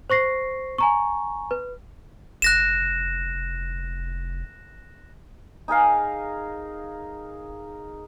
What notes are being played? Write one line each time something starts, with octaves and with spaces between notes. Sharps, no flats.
C5 C#6 A#6 C7
G#5 A#5 C#6
B4
F1 F#6 A#6 E7
D#4 G#4 A#4 F5